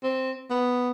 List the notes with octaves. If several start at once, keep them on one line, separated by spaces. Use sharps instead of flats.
C4
B3